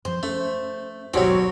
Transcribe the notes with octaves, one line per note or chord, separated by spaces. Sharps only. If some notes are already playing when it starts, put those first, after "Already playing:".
F#2 F3 C5
A3 C#4
G#1 D#2 B2 F#3 C4 F#4 G4 C#5